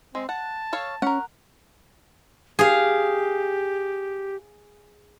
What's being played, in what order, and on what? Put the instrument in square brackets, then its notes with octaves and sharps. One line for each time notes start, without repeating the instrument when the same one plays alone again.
[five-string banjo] G#3 [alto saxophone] C4
[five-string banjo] F#5 [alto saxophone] A5
[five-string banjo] A4 C#5 F5
[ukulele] C#4 [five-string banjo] A#4 F#5
[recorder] G4 [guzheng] G#4 F5